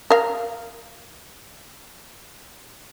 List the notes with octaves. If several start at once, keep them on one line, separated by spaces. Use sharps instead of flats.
A#4 F5